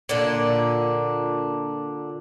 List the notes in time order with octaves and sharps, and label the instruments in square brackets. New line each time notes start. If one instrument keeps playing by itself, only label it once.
[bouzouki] A#2 D3 D4